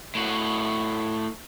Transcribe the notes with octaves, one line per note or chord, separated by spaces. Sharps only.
A2 F#4